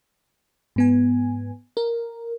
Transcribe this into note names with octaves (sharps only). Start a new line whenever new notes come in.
G#2 B3 G#5
A#4